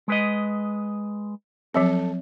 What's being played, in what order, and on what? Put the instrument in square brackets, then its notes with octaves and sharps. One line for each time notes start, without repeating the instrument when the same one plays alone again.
[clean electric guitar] G#3 B4 D#5
[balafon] F3 F#3 C4 [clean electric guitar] A4